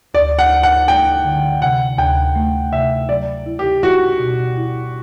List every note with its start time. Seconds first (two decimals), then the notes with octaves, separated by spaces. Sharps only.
0.14 D2 D5
0.39 F#5
0.51 D2
0.63 F#5
0.88 A3 G5
1.24 D3
1.62 C3 F#5
1.98 D2 G5
2.36 A3
2.73 C3 E5
3.09 F#3 D5
3.46 E4
3.59 G4
3.83 E4 F#4
4.20 B2
4.57 E4